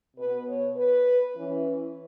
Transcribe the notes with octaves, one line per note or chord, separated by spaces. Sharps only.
B2 B3 B4
C#5
B4
E3 C#4